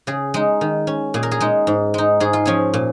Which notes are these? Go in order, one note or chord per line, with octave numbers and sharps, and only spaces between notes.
C#3 G#4
G#3 D#4
D#3
C#4
A#2 G#4
A#4
G#4
G#3 D#4
G#2
G#3 D#4
G#2 G#4
F4
F3 C#4 G#4
A#2